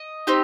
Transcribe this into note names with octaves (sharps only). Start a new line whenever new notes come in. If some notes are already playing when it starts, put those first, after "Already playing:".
Already playing: D#5
C4 D#4 G4